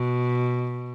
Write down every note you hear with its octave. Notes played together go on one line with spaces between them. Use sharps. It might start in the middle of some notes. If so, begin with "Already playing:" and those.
Already playing: B2